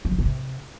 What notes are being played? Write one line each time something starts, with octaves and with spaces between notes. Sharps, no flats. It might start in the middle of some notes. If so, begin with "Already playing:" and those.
F#3
C#3
B2
C3